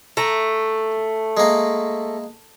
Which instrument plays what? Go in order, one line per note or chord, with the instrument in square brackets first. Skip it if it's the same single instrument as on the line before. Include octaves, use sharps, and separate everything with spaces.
[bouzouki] A3 [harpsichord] A#5
[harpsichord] G#3 A#3